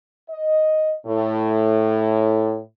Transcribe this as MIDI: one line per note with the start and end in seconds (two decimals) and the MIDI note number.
0.30 0.92 75
1.06 2.59 45